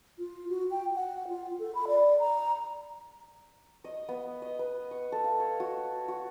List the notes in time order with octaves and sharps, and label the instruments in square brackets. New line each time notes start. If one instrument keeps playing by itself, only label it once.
[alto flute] F4
F#4
G5
F#5
F4
A4
B5
D5
A#5
[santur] D#5
B3
D#5
B4
C#6
A4
F5
C#5
F#4
F#4